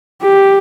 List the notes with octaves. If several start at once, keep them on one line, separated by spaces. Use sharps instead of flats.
G4